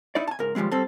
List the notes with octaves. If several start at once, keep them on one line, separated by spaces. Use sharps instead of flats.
D#4 E4 D5
G#5 A5
C#2 G#2 A#4
D#2 F3 G3 G#3 C4
G3 C4 A4